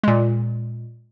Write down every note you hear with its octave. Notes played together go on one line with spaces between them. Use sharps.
A#2 G#3